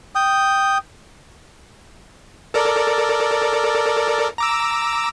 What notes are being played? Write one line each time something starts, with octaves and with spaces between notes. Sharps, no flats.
G5 D#6
A4 A#4 D5
A#5 D6 E6